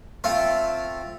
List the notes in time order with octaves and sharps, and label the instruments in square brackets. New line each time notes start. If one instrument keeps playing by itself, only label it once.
[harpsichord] A3 C4 F4